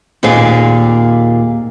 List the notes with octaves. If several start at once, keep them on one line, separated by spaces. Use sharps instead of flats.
D#2 A#2 C4 G#4 F5